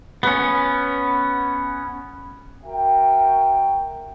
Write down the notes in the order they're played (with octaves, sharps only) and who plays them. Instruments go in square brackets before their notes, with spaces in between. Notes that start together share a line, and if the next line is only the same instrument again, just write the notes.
[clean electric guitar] B3 C#4
[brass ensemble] F#4 A#4 E5 G5